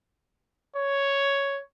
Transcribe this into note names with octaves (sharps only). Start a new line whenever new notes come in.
C#5